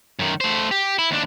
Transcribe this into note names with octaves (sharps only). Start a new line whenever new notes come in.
F#2 D#3
A3 C5
G4
E4
D#2 D4